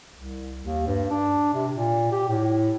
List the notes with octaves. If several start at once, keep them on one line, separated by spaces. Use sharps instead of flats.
C2
D#2
G2
D4
C3
A#2
G4
A2